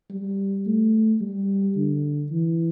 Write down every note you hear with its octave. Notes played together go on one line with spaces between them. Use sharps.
G3
A3
G3
D3
E3